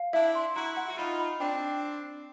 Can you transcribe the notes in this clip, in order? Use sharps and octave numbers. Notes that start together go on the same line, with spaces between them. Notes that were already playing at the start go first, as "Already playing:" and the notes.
Already playing: F5
D4 E4 E5
C6
E4 F#4 A#5
F#5
F#4
D#4 F4 B5
B5
C4 D4 G5